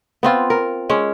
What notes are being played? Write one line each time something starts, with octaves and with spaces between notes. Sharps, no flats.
B3 C4 F4
A#4
G#3 C#4